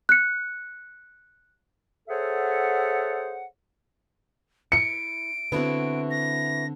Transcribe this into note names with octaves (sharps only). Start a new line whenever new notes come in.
F#6 C#7
G#4 A4 C5 C#5 E5 F#5
E4 C#7 D7
D3 B3 C4 E4 F#4
A#6